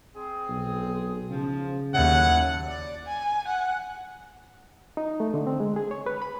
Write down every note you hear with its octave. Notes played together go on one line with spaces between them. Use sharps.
C4 G#4
B1
C#3 F3
D#2 A2 F#3 F#5
D5
G#5
F#5
D#4
A3
D3
C4
G#3
G#4
C#5
B4
B5